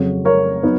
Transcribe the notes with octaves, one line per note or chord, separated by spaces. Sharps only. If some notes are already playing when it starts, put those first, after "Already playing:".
Already playing: F2 C#3 F#3
A#4 C#5
F#3 B3 D#4